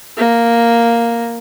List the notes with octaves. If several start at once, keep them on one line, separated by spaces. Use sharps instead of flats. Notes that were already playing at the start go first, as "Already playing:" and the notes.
A#3